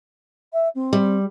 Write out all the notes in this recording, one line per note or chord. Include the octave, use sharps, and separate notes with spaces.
E5
C4
G3